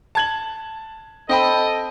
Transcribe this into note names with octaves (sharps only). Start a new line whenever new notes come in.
A5 G#6 F#7
C4 A4 D#5 G5 B5